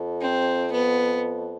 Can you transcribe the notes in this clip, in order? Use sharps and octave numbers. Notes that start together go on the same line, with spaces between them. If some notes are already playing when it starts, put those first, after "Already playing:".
Already playing: F2
C4
B3